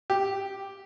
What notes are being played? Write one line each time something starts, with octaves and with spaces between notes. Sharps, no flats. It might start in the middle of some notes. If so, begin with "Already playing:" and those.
G4